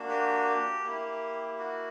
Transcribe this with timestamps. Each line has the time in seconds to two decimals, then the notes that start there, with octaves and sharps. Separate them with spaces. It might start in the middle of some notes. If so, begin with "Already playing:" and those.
Already playing: A#3 D4 F#4
0.09 G4
0.84 A#3 E4
1.59 F#4